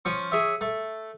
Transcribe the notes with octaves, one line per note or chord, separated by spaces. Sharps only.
F3 C#4 C#6
G#4 C#5 E5
A3